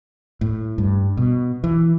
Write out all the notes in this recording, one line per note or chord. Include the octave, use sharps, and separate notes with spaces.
A2
G2
B2
E3